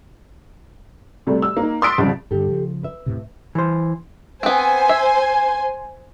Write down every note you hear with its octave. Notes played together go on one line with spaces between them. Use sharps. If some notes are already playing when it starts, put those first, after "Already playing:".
C3 G3 A3
E6
A#3 D#4
C6 D#6 E6 A6 B6 D7
C2 F2 C#3
G2 D3 G4 A4
C#3 F3
B4 E5
E2 A2 C3
E3 C5
B3 C4 C5 G#5
E5